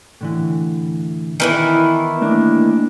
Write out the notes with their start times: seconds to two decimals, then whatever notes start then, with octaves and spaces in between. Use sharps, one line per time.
0.21 A2 D3 E3
1.40 D#3 E3 B3 E4 B4
2.21 A3 A#3 D4